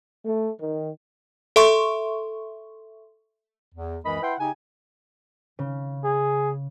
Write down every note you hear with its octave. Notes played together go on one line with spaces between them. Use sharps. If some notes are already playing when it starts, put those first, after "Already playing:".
A3
D#3
A4 E5 C6 C#6
E2
C#2 F#2 E3 D#5 B5
E4 B4 E5 F#5 G5 C6
C#3 D#4 G4 G#5
C#3
G#4